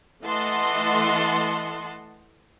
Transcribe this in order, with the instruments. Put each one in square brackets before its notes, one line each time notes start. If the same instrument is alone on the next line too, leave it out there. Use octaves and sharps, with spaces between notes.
[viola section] E3 A3 D#5 F#5 A5 C6